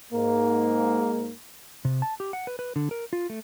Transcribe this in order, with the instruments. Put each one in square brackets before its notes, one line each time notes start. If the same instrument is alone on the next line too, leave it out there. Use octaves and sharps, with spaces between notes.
[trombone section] G#2 A#3
[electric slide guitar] C3
A5
G4
F#5
B4
B4
D3
A#4
F4
A3